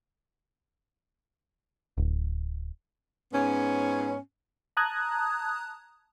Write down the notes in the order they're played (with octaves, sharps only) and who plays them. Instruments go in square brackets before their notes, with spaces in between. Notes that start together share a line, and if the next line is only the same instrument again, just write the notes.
[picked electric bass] D1
[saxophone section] G#2 B3 C#4
[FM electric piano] A5 A#5 D#6 F#6 G#6